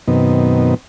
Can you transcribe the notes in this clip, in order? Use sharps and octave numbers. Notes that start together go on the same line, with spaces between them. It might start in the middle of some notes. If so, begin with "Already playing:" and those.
F#2 B2 D#3 B3 C4 D#4